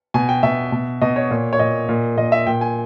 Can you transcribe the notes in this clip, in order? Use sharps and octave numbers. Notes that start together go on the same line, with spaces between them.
B2 G#5
G5
B2 E5
B2
B2 D#5
C#5
A#2
C#5
A#2 D#5
A#2
A#2 D#5
E5
A#2 G5
G#5